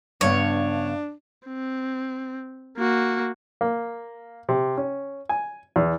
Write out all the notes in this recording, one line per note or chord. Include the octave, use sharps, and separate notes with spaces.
G2 C#3 B3 D4 C#5
C4
A#3 F#4
A#3
C3
C#4
G#5
E2